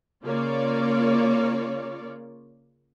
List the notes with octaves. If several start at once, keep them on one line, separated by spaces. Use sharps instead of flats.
C#3 A#3 F4 C#5 D5